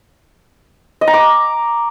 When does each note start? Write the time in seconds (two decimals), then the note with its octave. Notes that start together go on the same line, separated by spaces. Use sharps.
1.01 D#5
1.07 A#5
1.14 D6